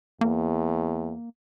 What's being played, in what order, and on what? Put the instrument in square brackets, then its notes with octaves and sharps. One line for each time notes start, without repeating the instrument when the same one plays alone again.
[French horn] E2 [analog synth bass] A#3